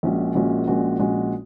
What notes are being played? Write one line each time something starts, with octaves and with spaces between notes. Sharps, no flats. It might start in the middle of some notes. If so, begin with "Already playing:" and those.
A#1 A#2 G#3 C#4 F#4
A#1 A#2 G#3 C#4 F#4
A#1 A#2 G#3 C#4 F#4
A#1 A#2 G#3 C#4 F#4